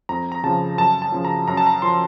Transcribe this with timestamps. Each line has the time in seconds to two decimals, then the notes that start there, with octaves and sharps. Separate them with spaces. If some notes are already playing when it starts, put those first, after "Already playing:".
0.09 F2 A#5
0.32 A#5
0.44 C#3 F3 A5
0.78 F#2 A5
1.02 A5
1.12 C#3 F3
1.25 A#5
1.48 F#2 A#5
1.57 A5
1.67 A#5
1.82 F3 C6